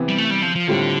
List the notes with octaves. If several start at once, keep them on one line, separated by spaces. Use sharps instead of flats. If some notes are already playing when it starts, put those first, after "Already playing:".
Already playing: C3 E3 B3
G3
A3
G3
F3
F3
A2 D3 G3 C4 F4